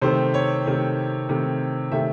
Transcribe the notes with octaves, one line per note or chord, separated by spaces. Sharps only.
C3 D#3 A3 C5
C#5
C3 D#3 A3
C3 D#3 A3
C3 D#3 A3 E5